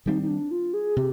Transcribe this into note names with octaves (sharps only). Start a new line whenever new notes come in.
D#3 G3 C4 D#4
D#4
D4
F4
G#4
C3 G4